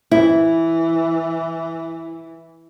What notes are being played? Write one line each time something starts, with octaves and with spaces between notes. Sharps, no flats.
E3 E4